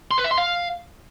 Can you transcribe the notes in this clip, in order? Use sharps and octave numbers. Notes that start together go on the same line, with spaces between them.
C6
B4
E5
C6
F5